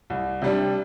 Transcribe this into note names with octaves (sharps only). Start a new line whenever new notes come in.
C2
C3 G3 D4